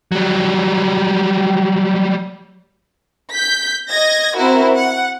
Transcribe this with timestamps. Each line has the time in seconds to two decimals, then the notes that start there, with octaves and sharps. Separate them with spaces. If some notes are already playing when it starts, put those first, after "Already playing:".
0.12 F#3 G3
3.33 G6 B6
3.89 D#5 G#6 A#6
4.35 C4 E4 F#4 A#4
4.75 F#5